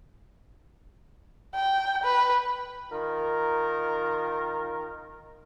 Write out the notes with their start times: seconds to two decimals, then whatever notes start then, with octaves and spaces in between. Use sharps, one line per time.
1.55 G5
2.04 B4
2.91 D#3 F4 A#4